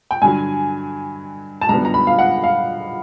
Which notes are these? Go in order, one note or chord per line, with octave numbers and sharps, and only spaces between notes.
G5
G2 D3 F#3 G#5
A5
F#2 D3 G3 B3 A#5
A#5
B5
F5
F#5
F5